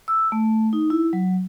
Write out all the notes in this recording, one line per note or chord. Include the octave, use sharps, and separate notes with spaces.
E6
A3
D#4
E4
F#3